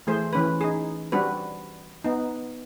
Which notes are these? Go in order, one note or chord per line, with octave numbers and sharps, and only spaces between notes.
E3 A3 G#4 C5
E3 C#4 B4
D#4 G#4
G3 C4 D4 F#4 B4
B3 D#4